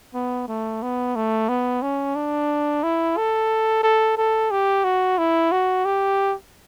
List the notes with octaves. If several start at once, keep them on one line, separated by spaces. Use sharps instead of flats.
B3
A3
B3
A3
B3
C#4
D4
E4
A4
A4
A4
G4
F#4
E4
F#4
G4